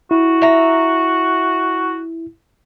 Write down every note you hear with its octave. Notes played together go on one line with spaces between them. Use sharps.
E4 F#4
E5 A#5